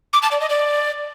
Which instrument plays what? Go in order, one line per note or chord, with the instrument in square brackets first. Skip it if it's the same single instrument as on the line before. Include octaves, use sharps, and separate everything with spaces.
[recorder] D6
A5
D5
D#5
D5